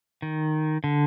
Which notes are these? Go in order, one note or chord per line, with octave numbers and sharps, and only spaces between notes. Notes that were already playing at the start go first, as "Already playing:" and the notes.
D#3
D3